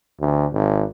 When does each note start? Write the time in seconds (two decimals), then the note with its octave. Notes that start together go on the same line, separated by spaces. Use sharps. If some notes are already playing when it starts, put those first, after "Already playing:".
0.20 D2
0.53 G#1